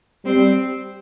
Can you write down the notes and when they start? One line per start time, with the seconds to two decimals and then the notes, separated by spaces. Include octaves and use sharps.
0.26 G3 C4